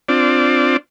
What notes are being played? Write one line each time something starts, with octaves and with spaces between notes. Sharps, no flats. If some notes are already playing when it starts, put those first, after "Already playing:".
C4 D4 F4 D5